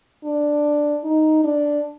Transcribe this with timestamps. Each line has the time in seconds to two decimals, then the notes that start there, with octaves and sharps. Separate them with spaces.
0.24 D4
1.04 D#4
1.44 D4